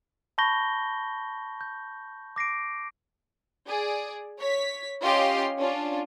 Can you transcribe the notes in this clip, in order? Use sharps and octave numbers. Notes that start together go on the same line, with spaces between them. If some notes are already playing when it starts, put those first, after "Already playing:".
A5 B5 C#6 G6 A#6 G7
G6
D6 A#6 C7 D7
G#4 D5
C#5 B6
C#4 F4 G4 D#5 F5 C6
C#4 D4 F4